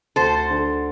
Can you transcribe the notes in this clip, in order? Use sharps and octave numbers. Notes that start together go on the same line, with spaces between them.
D2 A4 C5
D3